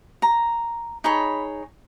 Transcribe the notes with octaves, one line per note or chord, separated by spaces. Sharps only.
A#5
D#4 G#4 C#5 B5